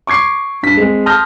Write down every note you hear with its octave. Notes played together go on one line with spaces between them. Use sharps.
C#6 D6 G#6 C7
G2 B6
G#3 C4 G#4
A5 C6 D#6 F6 G6 A#6